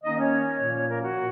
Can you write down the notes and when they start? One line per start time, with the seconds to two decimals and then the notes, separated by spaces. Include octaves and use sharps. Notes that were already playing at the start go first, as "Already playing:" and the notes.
0.04 D#3 A#3 C#4 D#4 D#5
0.18 C#4 C#5
0.60 A#2 F3 A#3 C#4
0.88 A#3 A#4
1.02 F#4
1.16 A#2